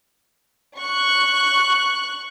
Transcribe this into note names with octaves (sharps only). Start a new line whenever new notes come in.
C#6 F#6